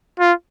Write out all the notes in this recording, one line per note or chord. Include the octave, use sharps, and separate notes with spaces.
F4